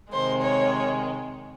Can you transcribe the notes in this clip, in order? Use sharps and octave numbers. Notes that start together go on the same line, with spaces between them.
C3 D#3 G#3 C5
C#5